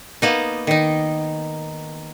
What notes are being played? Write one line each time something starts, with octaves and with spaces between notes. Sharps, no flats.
A#3 B3 D#4
D#3 D#4